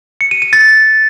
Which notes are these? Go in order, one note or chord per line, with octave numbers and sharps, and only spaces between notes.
C#7
D#7
D#7
A6